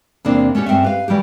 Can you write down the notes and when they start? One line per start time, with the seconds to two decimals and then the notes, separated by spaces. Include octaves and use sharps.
0.25 E2 C3 A#3 C4 D4
0.55 A3 C#4 D4 F#4 G4
0.66 G2 C4 C#4 E5
0.83 G4 B4 F5
1.08 E3 G3 F#4 G4